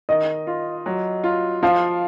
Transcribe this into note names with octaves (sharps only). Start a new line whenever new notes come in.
D#3 D#5
F4
F#3
F4
F3 F5